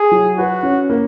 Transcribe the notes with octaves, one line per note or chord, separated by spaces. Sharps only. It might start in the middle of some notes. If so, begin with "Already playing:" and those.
Already playing: G#4
F#3
F#4 B4
C#4
A#3